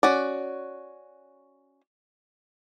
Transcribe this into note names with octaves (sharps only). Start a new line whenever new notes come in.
C#4 F#4 D5